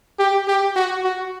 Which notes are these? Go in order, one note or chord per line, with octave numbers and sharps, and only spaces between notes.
G4
G4
F#4
F#4